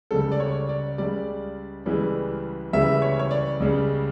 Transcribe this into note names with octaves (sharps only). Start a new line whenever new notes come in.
C#2 C#3 G3 A4
D5
C#5
D5
C#2 C#3 G3 D5
C#2 C#3 E3 G3
C#2 C#3 E3 G3 E5
C#5
C#5
D5
C#2 C#3 G3